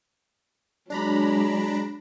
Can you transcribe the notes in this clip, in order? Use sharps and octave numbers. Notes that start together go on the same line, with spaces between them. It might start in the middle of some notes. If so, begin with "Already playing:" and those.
F#3 G#3 D4 A#5 B5